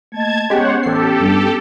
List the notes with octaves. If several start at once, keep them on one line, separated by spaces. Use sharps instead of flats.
A3 A#3 D#5 A5 G#6
G#3 B3 C#4 G4 C5 C#5 F#5
A1 G4 A4 C7
G2